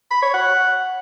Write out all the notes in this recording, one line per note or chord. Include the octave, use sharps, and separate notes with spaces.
B5
C#5
F#5